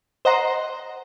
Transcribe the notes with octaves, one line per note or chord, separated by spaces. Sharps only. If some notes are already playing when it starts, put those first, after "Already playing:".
C5 D#5 F#5 A#5 C6